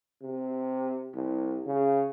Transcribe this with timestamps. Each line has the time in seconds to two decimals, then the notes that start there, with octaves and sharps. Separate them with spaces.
0.22 C3
1.15 C2
1.66 C#3